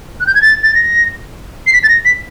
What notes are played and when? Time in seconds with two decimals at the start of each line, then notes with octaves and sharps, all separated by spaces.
0.20 F#6
0.27 G6
0.35 G#6
0.42 A6
0.63 A6
0.75 A#6
1.67 C7
1.73 B6
1.84 A6
1.89 A#6
2.05 B6